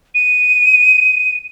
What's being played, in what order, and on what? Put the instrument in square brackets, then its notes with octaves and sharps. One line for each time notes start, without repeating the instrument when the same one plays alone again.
[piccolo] D#7